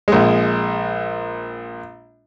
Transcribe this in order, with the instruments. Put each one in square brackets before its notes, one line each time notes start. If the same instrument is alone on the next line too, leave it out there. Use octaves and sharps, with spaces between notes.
[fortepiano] A#1 G#3